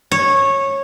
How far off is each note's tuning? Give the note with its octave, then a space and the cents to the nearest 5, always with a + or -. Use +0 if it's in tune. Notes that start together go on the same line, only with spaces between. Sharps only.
C#5 -15